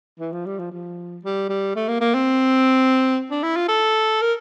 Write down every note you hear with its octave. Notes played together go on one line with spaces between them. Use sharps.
E3
F3
G3
F3
F3
G3
G3
A3
A#3
A#3
C4
D4
E4
F4
A4
A#4